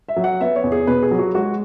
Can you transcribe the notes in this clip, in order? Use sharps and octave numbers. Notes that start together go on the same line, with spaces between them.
E5
F#3
F#5
B3 E5
C#5
E2
G#4
B2 B4
G#4
F#3
F#4
G#3 F#4